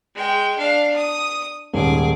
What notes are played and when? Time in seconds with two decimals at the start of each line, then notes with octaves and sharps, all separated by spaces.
0.15 G#3 G5
0.58 D4 F5
0.96 D#6
1.74 D#1 G#2 G#4 D6